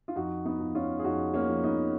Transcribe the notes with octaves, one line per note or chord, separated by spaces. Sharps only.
F4
F2 D#4 F#4
B3 D#4
F3
C#4 F4
G#4
F2 D#4 F#4
A#3 C#4
F3
B3 D#4